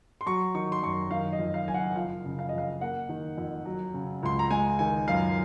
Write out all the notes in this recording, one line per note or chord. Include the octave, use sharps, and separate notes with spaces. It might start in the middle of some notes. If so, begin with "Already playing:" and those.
C6
F#3 C#6
D#3 C#6
C6
F#2 C#6
D#3 F5
D#5
F2
F5
F#1 G#5
F#5
F3 F5
C#3
F5
F2 D#5
F5
A#3 F#5
D#3
F2
F#3
C#3
C#2 C6
A#5
G#3 G#5
D#3 G#5
F#2 F5